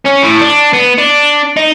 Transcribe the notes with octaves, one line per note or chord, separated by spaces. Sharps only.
C#4
A2
D4
B3
D4
D#4